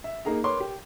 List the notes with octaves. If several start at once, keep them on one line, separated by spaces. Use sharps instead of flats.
E5
A#3 D#4 G#4 A#5
A#4 B4 C#5 C6 D6
G4